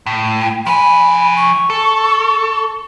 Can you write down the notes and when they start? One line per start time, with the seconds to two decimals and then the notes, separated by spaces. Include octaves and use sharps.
0.06 A2
0.67 F3 G#5 B5
1.36 C#6
1.70 A4